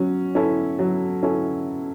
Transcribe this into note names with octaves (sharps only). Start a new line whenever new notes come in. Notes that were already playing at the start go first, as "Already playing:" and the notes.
Already playing: F#3 C#4
C#4 E4 A4
F#3
C#4 E4 A4